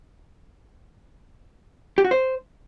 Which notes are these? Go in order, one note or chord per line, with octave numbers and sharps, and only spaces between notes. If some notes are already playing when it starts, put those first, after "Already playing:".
G4
F#4
C5